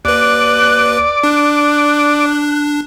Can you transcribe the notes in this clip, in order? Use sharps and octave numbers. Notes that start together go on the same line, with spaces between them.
D#2 B4 D5 F#6
D4 F#6